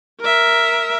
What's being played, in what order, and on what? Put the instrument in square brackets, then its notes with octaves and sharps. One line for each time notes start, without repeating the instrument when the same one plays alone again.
[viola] A#4 E5